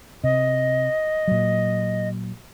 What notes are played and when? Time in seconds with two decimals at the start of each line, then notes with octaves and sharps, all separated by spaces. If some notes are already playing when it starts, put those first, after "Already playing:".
0.24 C3 D#5
1.28 A#2 F#3